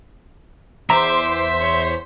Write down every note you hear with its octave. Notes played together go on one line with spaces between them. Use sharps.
E2 C5 E5 A#5 C6 D6 B6
C#5 C6